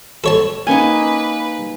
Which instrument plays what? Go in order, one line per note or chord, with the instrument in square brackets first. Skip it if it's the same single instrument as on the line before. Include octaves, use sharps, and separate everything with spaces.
[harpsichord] A4 C#5 A5
[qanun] A#3 D#4 [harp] C#4 G#5 [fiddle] B4